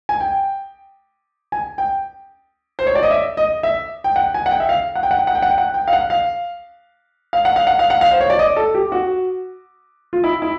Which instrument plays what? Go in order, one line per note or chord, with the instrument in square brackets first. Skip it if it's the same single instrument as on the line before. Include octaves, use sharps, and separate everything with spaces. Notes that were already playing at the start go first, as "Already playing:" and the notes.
[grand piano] G#5
G5
G#5
G5
C5
C#5
D5
D#5
E5
D#5
E5
G5
F#5
G#5
F#5
G5
E5
F5
F#5
G5
F#5
G5
F#5
G5
F#5
G5
F#5
G5
F5
F#5
F5
F5
F#5
F5
F#5
F5
F#5
F5
C5
C#5
D5
D#5
A4
G4
F#4
F4
E4
E4